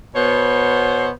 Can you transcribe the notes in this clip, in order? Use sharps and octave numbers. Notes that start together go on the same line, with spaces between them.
B2 B3 C5 C#5